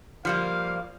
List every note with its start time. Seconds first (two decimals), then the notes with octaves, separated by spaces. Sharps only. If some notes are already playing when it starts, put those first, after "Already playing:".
0.25 F3 G3 A#3 F5